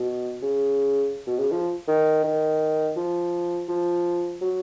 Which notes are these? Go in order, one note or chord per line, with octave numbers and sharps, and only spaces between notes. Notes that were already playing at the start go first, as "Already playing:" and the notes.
Already playing: B2
C#3
B2
C#3
F3
D#3
D#3
F3
F3
F#3